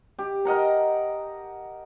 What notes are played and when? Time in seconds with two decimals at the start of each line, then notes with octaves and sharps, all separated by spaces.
0.19 G4
0.45 A#4 D#5 F#5 A#5